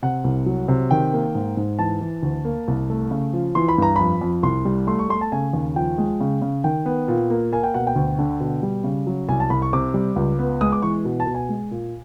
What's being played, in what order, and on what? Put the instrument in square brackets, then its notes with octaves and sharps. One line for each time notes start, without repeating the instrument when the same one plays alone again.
[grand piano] C3 F#5
C2
F#3
C3
D#3 G5
A#3
G#2
G#2
E3 A5
E3
D2
A#3
C2
A3
C#3
F3
E3 C6
B5
G2 A#5
F2 B5
F2
C2 C6
G3
A3 C6
C#6
A3 C6
A5
C#3 G#5
D#2
F3 G5
G#3
C#3
C#3
D#3 G5
B3
A#2
A#3
A#3 G#5
G5
B2 F#5
G5
D2
D3
B2
G3
C#3
F#3
C2 G#5
A5
C2 B5
C#6
C3 D6
G3
C#2
B3
G#3 D#6
D6
E3 C#6
B2
A5
B2
G#5
G#3
A#2